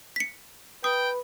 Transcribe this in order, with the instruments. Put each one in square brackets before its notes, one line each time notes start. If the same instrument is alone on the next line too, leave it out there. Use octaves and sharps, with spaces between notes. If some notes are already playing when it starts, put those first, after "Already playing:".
[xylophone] B6 C#7
[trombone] B4 [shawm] G5 [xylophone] D#6